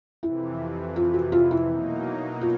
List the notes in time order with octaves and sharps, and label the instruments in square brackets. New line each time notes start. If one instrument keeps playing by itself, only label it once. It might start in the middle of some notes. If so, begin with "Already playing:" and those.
[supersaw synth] F2 C3 E3 [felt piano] E4
[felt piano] F4
F#4
F4
E4
[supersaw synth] B2 F#3 A#3 D#4
[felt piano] F4